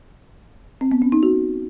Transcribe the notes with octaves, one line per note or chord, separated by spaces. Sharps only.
C4
B3
C#4
D#4
F#4